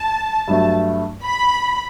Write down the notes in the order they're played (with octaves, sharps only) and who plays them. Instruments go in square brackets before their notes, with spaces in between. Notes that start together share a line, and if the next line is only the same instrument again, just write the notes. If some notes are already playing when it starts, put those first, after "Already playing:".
Already playing: [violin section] A5
[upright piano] G2 F#3 A3
[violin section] B5